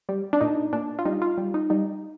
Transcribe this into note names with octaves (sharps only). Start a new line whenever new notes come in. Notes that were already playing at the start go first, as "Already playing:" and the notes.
G3
D4
A#2 D#4
A#2 D4
F4
G3 D#4
F4
G3
D#4
G3 D#4